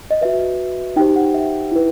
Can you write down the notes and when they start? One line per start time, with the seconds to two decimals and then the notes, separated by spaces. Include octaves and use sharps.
0.11 D#5
0.21 F#4 B4 E5
0.96 D#4 G4 C5 G5
1.16 F#5
1.34 E5
1.72 E4 B4